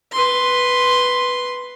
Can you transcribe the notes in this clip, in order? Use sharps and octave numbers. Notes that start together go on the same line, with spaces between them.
B4 C6